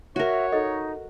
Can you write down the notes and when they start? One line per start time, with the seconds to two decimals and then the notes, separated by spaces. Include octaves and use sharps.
0.16 F#4 A#4 C#5 E5
0.52 D#4 A4 D#5